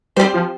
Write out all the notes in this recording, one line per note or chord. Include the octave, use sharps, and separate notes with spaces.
G3 C4 G4 C5
F3